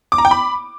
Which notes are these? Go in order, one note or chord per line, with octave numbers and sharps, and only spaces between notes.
D6
A#5
G5
B5